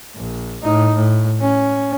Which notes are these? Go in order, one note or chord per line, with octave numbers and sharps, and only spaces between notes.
A#1
A2 D#4
A2
C#4